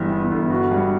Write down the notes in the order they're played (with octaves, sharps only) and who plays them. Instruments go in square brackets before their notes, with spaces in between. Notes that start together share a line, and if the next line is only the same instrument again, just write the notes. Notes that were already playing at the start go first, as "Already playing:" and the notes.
Already playing: [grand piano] G1 G2 E3 B3
B3
G1
F#4
G2